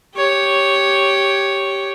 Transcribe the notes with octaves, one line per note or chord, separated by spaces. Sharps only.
G4 C#5